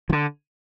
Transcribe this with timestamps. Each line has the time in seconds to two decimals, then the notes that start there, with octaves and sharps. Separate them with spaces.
0.10 F3
0.13 D3